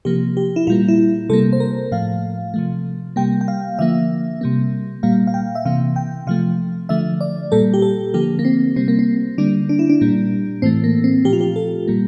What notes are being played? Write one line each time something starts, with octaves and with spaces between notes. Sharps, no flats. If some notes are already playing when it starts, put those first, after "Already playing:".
C3 F3 A#3 G4
G4
E4
A#2 G3 A#3 F4
E4
C3 G3 A#3 A4
C5
A#4
A2 F3 A3 F5
C3 F3 A3
C3 G3 A#3 G5
G5
F5
D3 F3 A#3 E5
C3 G3 A#3
A#2 G3 A#3 F5
F5
G5
E5
C3 E3 A#3 F5
G5
C3 F3 A3 F5
D3 F3 A3 E5
D5
A#2 G3 A#3 A4
G4
A4
D3 F3 A#3 G4
A#3
C4
C3 G3 A#3 C4
A#3
C4
D3 G3 A#3 D4
D4
E4
D4
A#2 G3 A#3
A2 E3 A3 C4
A#3
C4
A#2 F3 A3 G4
F4
G4
A4
A#2 G3 A#3